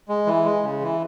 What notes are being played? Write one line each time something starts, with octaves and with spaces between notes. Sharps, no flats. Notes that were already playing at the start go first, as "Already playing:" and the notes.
G#3
E3
G#3
C#3
E3